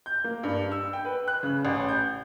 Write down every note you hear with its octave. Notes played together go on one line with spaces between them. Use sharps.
G6
A#3
G2
E6
G5
B4
F#6
C#3
A1
G6